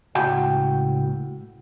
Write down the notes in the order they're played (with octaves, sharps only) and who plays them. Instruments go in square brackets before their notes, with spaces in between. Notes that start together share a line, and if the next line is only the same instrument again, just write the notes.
[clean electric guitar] C#2 A2 F#4 F#5 G5